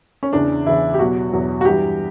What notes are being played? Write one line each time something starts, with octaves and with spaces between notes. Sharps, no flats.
C#4
E2 C#3 E3 D4
E2 C#3 E3 E4
G4
E2 B2 F#3 F#4
E2 B2 F#3
F#4
G2 E3 G4